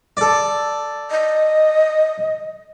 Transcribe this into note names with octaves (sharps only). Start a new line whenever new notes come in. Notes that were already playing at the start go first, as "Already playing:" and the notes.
A4 D5
D#5